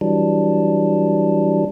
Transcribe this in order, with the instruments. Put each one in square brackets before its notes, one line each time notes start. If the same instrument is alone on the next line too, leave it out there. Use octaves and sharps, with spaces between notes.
[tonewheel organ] E3 F#3 G3 D4